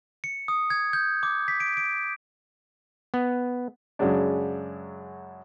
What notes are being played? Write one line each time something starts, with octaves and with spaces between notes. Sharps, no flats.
C#7
D#6
G#6
G6
D6
B6
D7
D7
B3
F#2 C#3 F#3 G#3 D4